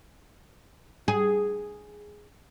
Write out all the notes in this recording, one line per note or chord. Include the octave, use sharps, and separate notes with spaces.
G#4